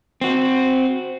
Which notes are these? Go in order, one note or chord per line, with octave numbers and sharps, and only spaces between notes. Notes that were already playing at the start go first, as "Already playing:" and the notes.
C4 F#4